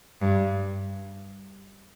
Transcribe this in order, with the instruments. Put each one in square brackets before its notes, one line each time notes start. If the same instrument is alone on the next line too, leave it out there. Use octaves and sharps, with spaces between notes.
[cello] G2